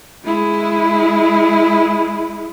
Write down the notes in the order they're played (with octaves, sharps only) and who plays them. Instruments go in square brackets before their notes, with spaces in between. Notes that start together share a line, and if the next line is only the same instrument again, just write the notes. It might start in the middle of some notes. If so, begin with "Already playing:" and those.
[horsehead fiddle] G#3 E4